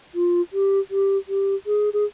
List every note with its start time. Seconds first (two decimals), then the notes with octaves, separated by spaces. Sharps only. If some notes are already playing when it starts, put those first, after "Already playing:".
0.15 F4
0.53 G4
0.91 G4
1.29 G4
1.66 G#4
1.93 G#4